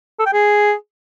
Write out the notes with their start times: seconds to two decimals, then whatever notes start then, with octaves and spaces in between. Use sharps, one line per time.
0.20 A4
0.26 G5
0.33 G#4